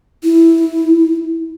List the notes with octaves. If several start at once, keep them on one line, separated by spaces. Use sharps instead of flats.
E4